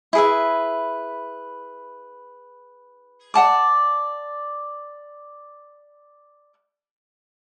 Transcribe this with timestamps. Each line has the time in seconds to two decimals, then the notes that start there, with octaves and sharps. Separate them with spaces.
0.13 E4 G#4 B4 E5
3.34 D5 F#5 A5 D6